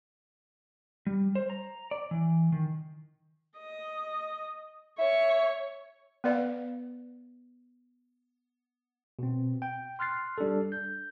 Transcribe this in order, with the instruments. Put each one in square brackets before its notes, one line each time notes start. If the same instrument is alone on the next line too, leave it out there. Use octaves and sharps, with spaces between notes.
[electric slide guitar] G3
C5
A#5
D5
E3
D#3
[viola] D#5
[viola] C#5 [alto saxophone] E5
[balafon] B3 B4 D5 F5
[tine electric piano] B2 C4
G5
C6 F6 F#6 A6 C7
G3 D4 G4 A4
G6